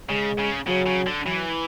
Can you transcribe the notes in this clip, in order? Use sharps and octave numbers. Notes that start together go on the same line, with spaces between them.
C#3 G#3
C#3
C#3 F#3
C#3
D3
E3 F#3